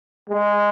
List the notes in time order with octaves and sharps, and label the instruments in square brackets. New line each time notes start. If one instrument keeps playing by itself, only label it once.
[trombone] G#3